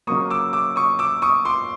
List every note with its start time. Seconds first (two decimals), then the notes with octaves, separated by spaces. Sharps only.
0.07 C#3 F#3 A#3 C#6 D#6
0.30 D6 E6
0.53 D6 E6
0.76 C#6 D#6
0.99 D6 E6
1.22 C#6 D#6
1.45 C6 D6